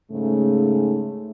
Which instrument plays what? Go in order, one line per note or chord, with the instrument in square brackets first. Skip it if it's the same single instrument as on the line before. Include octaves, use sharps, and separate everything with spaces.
[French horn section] G#2 C#3 A3